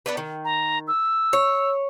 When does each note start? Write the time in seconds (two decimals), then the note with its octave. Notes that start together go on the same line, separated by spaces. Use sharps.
0.06 B3 D4 B4
0.17 D#3
0.45 A#5
0.88 E6
1.33 C#5